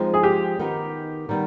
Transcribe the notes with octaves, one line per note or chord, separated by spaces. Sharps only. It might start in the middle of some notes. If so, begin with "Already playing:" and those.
Already playing: F3 G#3 C4 D#4
G#4
G4
D#3 B3 D#4
D#3 G3 B3